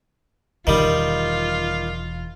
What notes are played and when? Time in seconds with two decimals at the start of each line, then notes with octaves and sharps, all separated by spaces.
0.67 E1 E2 D#3 G3 F4